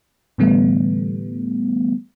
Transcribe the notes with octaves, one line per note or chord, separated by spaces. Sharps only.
A2 D3 E3 G3 A3 B3